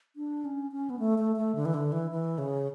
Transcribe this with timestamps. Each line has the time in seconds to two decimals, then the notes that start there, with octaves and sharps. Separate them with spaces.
0.16 D4
0.45 C#4
0.72 C#4
0.90 B3
0.99 A3
1.18 A3
1.36 A3
1.55 D3
1.65 E3
1.74 D3
1.92 E3
2.11 E3
2.38 C#3